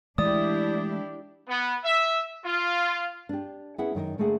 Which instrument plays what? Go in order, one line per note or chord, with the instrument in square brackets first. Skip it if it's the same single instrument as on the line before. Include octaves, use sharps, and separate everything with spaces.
[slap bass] E3 G#3 A3 [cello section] D4 E4 G4 [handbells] D5 D#6
[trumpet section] B3
E5
F4
[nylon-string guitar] D4 G4
B3 C#4 E4 G#4 E5 F#5
F#2 D#3 A#4 D#5
D3 A3 A#3 G#4 F#5